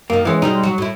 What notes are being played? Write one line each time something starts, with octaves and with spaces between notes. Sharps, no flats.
F#2 D#3 A#3
E3 G#3 B3 C#4
B2 G3 G#3 D#4
F#3 F#4
A2 E4